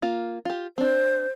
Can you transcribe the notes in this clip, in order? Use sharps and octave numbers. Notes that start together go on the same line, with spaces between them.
A#3 F4
F4 G4
C4 D4 C5